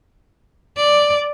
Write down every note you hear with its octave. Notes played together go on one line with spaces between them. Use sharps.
D5